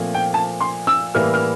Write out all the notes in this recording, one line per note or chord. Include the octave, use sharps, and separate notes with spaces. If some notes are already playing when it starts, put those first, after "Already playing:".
Already playing: A#2 F3 A3 C4
G5
A5
C6
E6
A2 E3 G3 A#3 F6
F6